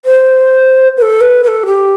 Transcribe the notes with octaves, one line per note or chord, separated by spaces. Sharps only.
C5
B4
A4
B4
B4
A4
G4